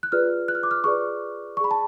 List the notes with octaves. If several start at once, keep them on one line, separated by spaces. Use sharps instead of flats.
F#6
F4 G#4 B4 D5 F6
F#6
F6
D6
F6
F4 G#4 B4 D5 C#6
G#4 D5 B5 C#6
A5